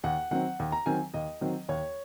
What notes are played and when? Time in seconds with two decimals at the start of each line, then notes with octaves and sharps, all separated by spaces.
0.04 D#2 F#5
0.31 D#3 F#3 C4 F#5
0.59 D#2
0.72 A#5
0.86 D#3 F#3 C4 G#5
1.14 D#2 D#5
1.41 D#3 F#3 C4
1.69 D#2 C#5